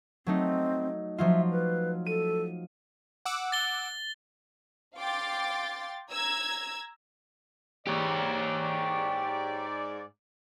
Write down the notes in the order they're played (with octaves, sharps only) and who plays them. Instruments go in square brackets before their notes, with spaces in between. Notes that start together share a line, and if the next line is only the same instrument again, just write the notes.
[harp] F#3 A3 D#4 [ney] C4
[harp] F3 F#3 F4 [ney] E5
[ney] B4
[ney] A4 [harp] D#7
[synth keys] F#5 D6 E6
[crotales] A6 G7
[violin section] F5 G5 C6 D6 A6
A#5 E6 G#6
[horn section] G#2 D5 [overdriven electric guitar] G4 C#5